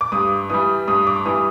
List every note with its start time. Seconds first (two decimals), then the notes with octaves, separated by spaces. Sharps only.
0.01 D6
0.12 G2 D#6
0.50 E3 G3 D#6
0.88 G2 D#6
1.07 D6
1.25 E3 G3 D#6